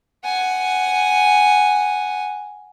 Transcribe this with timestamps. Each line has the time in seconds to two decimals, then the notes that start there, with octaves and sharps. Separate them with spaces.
0.24 F#5 G#5